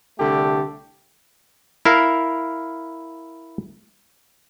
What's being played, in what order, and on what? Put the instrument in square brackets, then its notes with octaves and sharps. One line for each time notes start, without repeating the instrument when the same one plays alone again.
[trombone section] C2 D3 A3 D4 G4 A4
[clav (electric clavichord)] E4 A#4 F5